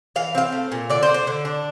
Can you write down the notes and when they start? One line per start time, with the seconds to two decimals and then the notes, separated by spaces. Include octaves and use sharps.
0.16 E3 F5
0.35 C4 F5
0.52 A3
0.72 A#2
0.90 D3 D5
1.03 C5
1.08 D3
1.14 C5
1.27 D3
1.45 D4